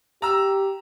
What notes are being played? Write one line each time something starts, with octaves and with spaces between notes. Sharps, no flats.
G4 A#5 E6